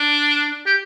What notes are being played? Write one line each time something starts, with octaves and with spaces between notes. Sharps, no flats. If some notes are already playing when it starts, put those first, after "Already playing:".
Already playing: D4
G4